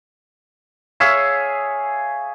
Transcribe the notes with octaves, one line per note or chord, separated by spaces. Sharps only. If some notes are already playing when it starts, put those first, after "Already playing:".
G#4 C#5 E5 F5